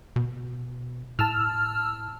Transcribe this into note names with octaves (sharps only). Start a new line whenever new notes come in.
B2
A2 A5 E6 F6